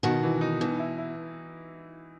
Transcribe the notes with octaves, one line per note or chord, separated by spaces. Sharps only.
B2 D#3 F#4
E3
D#4
B2 E3
E4
E4